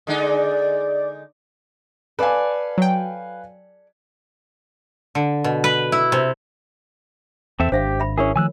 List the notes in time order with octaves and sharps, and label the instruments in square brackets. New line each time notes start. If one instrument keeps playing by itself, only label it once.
[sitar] D3 G#3 D#4 [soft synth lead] D5
[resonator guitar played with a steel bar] A4 D5 [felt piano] B4 F5 G#5
[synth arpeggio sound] F#3 G5
[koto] D3
B2
B4
E4
C3
[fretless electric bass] E2 [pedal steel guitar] C4 A4 E5
[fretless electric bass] G#1 D4 [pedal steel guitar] G4 [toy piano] C5 E5 F5
[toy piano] E5 B5
[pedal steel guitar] C#4 E4 G#4 [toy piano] A#4 C#5
[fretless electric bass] D#3 F3 A3 [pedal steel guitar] G#5 E6 F#6